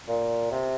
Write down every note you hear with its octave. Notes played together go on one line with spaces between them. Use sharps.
A#2
C3